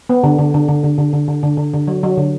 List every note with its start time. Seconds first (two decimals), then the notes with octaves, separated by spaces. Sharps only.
0.09 B3
0.23 D3
0.39 D3
0.54 D3
0.68 D3
0.84 D3
0.98 D3
1.13 D3
1.28 D3
1.43 D3
1.58 D3
1.73 D3
1.88 F#3
2.03 F#3
2.17 D3